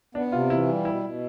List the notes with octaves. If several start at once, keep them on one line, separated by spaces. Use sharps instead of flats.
B3 D4
C3 F4
E3 E4
G3
B2 E4
B2